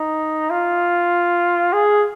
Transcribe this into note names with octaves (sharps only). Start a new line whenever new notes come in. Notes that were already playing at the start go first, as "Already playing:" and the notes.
Already playing: D#4
F4
G#4